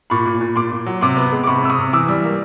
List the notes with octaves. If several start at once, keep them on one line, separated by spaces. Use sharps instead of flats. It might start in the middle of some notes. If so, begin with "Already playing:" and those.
A#2 B5 C#6
A#2
A#2
A#2 C6 D6
A#2
F#3
C3 C6 D6
B3
G#3
D6
C3 B5 C#6
C3 E6
C#6 D#6
C3
E3 D6 E6
G3
A#3